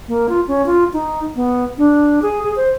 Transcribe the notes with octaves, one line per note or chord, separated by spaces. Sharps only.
A#3
F4
C#4
F4
D#4
B3
D4
G#4
G#4
C5